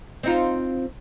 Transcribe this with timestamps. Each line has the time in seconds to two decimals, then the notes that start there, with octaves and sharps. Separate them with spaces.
0.23 C4 D#4 F4